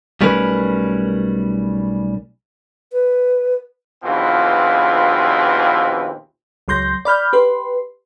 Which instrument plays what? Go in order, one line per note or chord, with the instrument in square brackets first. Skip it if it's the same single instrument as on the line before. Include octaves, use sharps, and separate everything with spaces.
[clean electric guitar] B1 G3 A3 C#4 A#4 B4
[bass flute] B4
[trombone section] A#1 D#2 B2 E3 C4 F4
[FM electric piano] C#2 F#3 C6 G6 A#6
D5 B5 F6 G6
G4 B4 C6